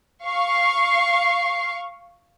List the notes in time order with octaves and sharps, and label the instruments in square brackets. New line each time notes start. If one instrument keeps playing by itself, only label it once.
[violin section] F5 C#6 C7